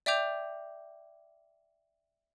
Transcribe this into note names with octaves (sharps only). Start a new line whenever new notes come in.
D5 E5 G5 D6 G6 F7